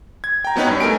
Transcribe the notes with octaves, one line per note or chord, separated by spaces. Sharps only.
G#6
G5 A#5
F#3 B3 C#4 D#4 B4 C#5
G2
A3 A#4 G#5 D7